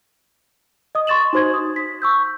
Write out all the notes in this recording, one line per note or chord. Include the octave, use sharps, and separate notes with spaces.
D#5 D#6
C6 C#6 A6 E7 F#7
D#4 F#4 C5 C6 G#6
D#6
B6
C#6 E6 G6